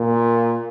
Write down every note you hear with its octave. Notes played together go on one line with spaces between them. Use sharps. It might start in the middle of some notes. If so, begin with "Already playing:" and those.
Already playing: A#2